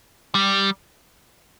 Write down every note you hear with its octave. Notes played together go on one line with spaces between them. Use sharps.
G3